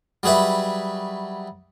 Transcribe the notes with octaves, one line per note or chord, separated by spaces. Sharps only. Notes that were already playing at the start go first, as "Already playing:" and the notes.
F#3 G3 G#4 B4 E5